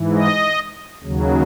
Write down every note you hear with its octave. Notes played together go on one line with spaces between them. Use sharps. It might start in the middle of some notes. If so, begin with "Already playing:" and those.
Already playing: G#2 E3
D#5
D#2 C#3 F#3